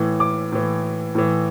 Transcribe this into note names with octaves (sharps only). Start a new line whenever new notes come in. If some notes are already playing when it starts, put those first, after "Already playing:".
Already playing: A2 E3
D6
A2 E3
A2 E3